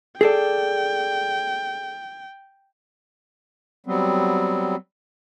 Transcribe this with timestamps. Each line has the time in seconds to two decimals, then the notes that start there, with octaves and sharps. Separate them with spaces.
0.21 G#4 A4 D5 G5
3.86 F#3 G3 B3 C4